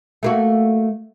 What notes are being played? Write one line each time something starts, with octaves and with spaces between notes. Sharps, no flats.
A3 A#3 F#4